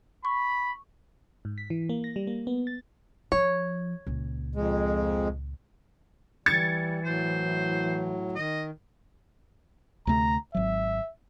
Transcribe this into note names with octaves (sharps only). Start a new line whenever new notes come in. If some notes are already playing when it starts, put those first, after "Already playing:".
B5 C#6
G#2
B6
E3
A#3
A#6
G3
A#3
B3
A6
F3 C#5
C#2 A#2
F2 G#3
E3 G3 G#6 A6 C#7
A2 F#3 C5
D#3 D#5
D2 C3 A3 A#5
G#1 F#3 E5